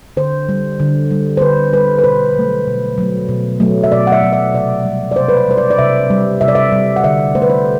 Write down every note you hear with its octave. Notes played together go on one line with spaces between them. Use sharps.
D3 C5
G3
D3
G3
C5
D3 B4
G3 B4
B4
B2 C5
F#3 A3
B2
F#3 A3
B2
F#3 A3
E5
B2 D5
F#5
E5
F#3 A3
E5
C3 D5
G3
D5
C3 C5
B4
C5
G3 C5
D5
D5
C3 E5
G3
C3 E5
D5
E5
G3
F#5
D3 E5
A3 C5
B4
C5